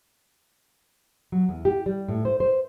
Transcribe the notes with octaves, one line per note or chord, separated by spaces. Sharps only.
F#3
E2
G4
G3
A2
C5
C5